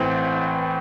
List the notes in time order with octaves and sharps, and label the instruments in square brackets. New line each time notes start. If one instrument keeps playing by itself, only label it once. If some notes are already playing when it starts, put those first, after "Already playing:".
Already playing: [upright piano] A1 A2 E3 C4